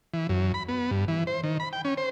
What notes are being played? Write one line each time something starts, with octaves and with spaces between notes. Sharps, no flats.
E3
F#2
B5
B3
G2
E3
C5
D#3
B5
G5
C#4
C5